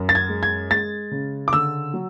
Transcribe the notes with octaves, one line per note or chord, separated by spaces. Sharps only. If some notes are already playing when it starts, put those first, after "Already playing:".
Already playing: F#2
A6
G#6
G#3
G#6
G#3 A6
C#3
D6
D3 E6
F#3